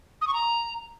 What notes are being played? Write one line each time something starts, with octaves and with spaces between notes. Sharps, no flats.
D#6
C#6
A#5